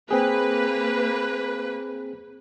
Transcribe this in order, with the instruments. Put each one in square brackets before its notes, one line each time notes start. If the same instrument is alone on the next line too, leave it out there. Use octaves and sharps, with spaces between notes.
[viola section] A#3 B4 [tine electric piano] C4 G#4